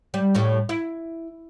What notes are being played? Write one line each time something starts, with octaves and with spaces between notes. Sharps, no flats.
G3
A2 G3 C#5
E4